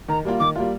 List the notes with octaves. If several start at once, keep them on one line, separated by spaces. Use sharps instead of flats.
D#3 A#5
G3 A#3 F4
D#3 D6
G3 A#3 F4